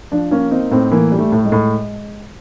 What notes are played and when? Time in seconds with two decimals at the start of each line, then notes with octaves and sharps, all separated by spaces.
0.12 F3 D4
0.31 A#3 C#4
0.51 C4 D#4
0.71 A2 C4
0.91 E3 A#3
1.12 G3
1.19 A3
1.32 A2
1.45 G#3
1.52 A2